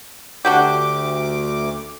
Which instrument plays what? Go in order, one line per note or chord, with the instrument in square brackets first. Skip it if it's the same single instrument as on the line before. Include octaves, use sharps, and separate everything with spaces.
[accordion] D2 D6 [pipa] D4 F#4 G4